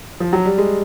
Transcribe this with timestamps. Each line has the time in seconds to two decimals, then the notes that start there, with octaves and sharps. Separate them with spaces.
0.20 F3
0.33 F#3
0.45 G3
0.58 G#3